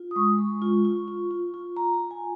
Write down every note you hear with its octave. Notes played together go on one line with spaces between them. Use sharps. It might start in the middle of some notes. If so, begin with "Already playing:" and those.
Already playing: F4
D#6
G#3 C#6
G#3
F4
F4
F4
F4
F4
F4 A#5
A#5
F4
G#5